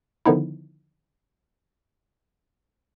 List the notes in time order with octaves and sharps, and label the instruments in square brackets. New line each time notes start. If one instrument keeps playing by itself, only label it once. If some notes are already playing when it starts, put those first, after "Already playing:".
[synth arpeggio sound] D3 D#3 F3 B3 D#4 E4